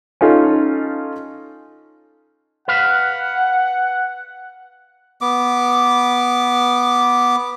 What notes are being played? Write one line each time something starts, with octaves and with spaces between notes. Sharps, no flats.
C#4 D#4 F4 A4
B4 F5 F#5
B3 D6